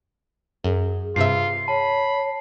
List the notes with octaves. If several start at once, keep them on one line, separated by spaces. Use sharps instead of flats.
F#2 G#4
G2 C3 F4 E5 C7
C#5 A5 B5